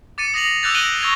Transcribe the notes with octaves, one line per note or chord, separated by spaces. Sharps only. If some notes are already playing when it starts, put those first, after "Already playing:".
D6 A6 C#7 D#7
D#6 A#6 C7 F7 F#7
D6 E6 F#6 G6 A6 F7
A6 A#6 D7 D#7 F#7 G7
C#6 E6 G#6 A#6 F7